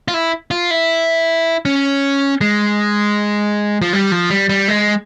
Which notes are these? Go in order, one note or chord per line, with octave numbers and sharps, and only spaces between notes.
F4
E4
F4
E4
C#4
G#3
F3
G3
F3
G3
G3
G#3